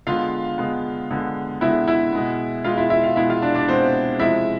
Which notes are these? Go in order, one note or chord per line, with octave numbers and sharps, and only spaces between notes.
D3 G#3 B3 F4 F5
D3 G#3 B3
D3 G#3 B3
D3 G#3 B3 E4 E5
E4 E5
B2 G#3 B3
B2 G#3 B3 F4 F5
E4 E5
E4 E5
F4 F5
B2 G#3 B3 E4 E5
F4 F5
D4 D5
D4 D5
B2 G#3 B3 C4 C5
C3 F3 G#3 E4 E5